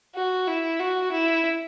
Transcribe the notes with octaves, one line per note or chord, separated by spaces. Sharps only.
F#4
E4
F#4
E4